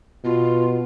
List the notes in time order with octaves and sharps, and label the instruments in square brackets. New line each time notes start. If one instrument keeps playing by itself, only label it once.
[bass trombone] B2 [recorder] F4